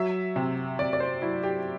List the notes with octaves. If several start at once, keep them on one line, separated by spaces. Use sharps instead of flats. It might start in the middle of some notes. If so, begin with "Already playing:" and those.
Already playing: F#3 E5
C3
C3 D5
D5
C5
F#3 E4
G4